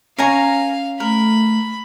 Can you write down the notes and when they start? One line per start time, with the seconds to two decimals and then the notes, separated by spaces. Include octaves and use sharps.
0.18 C#4 A#4 C#5 F5 G#5 A#5
1.00 A3 A#4 B5